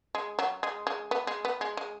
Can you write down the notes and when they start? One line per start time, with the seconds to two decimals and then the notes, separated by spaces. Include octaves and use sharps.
0.15 G#3
0.39 F#3
0.63 G#3
0.87 G#3
1.11 B3
1.27 G#3
1.45 B3
1.61 G#3
1.77 G#3